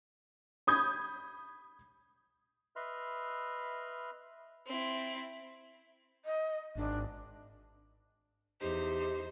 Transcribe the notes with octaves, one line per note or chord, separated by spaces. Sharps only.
B5 D#6 G6 G#6
B4 D#5 E5 B5 C6 F6
C4 E4
D#5
G#1 D4
E2 D#4 G4 C5